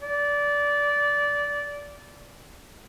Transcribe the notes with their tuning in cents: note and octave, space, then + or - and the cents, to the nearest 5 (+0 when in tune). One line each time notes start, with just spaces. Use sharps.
D5 -20